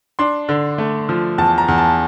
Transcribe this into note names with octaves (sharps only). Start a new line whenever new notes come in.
D4 C6
D3
A3
F3
E2 A5
A#5
E2
A5